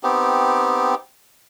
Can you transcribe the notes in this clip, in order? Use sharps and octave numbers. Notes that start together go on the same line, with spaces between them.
B3 C4 D#4 G4